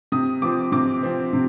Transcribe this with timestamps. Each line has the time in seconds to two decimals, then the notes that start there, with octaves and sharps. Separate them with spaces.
0.12 C3 D#6
0.42 F3 C4 D6
0.72 C3 D6
1.03 F3 C4
1.33 C3